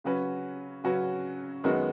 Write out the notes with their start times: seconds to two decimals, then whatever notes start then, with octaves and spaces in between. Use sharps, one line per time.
0.04 C#3 F#3 C#4 F#4 B4
0.84 C#3 F#3 C#4 F#4 B4
1.64 F#2 D#3 G#3 B3 F#4